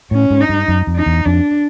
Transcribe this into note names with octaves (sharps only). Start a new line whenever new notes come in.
A2 C#4
G#2
D#4
G2
F#2
F2
D#4
E2
F2 D4